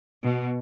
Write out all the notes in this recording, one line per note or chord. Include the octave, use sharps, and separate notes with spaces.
B2